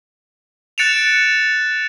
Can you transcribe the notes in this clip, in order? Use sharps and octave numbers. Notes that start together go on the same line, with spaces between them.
F#6 A6 C#7 D7 E7 F7